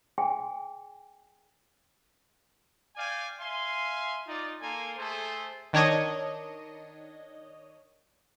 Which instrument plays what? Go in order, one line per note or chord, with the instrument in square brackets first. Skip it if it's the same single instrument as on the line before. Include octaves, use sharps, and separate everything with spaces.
[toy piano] G#4 G5 G#5
[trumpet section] D5 F5 G5 G#5
E5 F5 G#5 C6
D#4 F4 D5
A#3 A4 A#4 G#5 C6
A3 G#4 A4 C5
[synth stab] D#3 D4 C#5 D#5